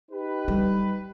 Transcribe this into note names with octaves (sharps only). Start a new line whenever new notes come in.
D#4 G4 B4
G3